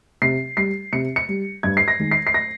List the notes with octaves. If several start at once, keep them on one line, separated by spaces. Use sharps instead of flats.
C3 C7
G3 C7
C3 C#7
C#7
G3
G2 G#6
C7
A#6
D#3 G#3
C7
C7
A#6